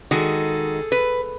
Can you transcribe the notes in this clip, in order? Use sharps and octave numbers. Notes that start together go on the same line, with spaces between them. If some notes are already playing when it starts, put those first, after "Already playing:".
D#3 G#3 F#4 G#4 A4
B4